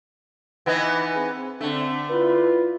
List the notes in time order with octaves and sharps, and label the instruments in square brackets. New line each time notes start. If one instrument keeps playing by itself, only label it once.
[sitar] E3 B3 D#4
[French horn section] C4 G#4
[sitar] D3 A3 [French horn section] C4 D4
[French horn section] E4 F4 B4